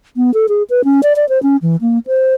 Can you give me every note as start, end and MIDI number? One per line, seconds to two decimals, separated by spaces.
0.17 0.33 59
0.34 0.46 69
0.49 0.63 68
0.70 0.84 71
0.84 1.01 61
1.03 1.13 74
1.16 1.28 74
1.29 1.41 72
1.43 1.57 61
1.62 1.76 52
1.81 1.99 58
2.07 2.34 72